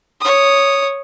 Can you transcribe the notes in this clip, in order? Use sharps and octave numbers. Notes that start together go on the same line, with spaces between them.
C#5 D#6